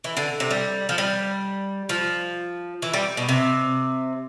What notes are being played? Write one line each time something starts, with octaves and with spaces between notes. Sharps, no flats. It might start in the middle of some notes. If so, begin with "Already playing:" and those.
E3
D3
C3
G3
F3
G3
F3
E3
G3
B2
C3